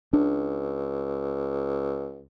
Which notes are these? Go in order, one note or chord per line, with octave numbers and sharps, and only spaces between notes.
C#2 D4